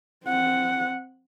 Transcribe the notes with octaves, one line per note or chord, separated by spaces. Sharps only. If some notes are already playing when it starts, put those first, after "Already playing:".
C4 F#5